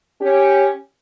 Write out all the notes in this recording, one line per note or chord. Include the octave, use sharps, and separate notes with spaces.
C#4 G4